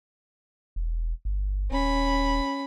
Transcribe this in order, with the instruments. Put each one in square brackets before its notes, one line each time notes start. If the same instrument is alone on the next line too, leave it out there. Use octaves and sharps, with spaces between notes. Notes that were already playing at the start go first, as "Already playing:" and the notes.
[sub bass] E1
G1
[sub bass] D#1 [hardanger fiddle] C#4 B5